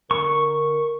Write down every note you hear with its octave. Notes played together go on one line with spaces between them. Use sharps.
D3 A#4 C#6